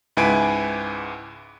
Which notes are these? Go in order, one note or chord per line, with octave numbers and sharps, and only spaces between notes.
C#2 G#2 E4 B4 G#5 D7